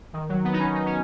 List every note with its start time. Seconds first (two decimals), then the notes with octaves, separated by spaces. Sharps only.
0.13 D#3
0.29 F#3
0.44 B3
0.53 D#4
0.59 C#4
0.75 D#4
0.86 C#4